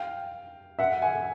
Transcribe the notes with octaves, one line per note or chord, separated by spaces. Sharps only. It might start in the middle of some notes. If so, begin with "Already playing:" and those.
Already playing: F5 G5
E5 F#5
F#5 G#5